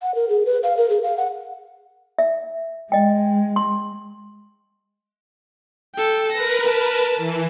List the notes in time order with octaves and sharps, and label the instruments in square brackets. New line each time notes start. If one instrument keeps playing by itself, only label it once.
[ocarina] F#5
A#4
G#4
B4
F5
A#4
G#4
F5
F#5
[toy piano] E5
[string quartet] G#3 [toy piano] D#5 G5
[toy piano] C6
[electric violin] A4 G5
[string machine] A#4 B4 [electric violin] A#6
[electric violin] A5
[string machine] E3